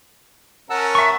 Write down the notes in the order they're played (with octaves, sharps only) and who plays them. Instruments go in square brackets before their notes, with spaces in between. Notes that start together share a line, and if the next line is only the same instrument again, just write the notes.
[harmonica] C#4 A#4 [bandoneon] F#5 A5 E6
[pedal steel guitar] E5 C#6